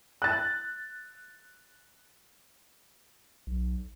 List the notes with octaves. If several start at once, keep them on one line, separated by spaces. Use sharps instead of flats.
F#6 A6
B1